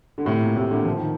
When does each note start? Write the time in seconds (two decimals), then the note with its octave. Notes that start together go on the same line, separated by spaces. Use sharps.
0.18 D3
0.25 A2 C3
0.41 A#2
0.56 A2 C3
0.71 A#2 D3
0.85 F3
0.97 D#3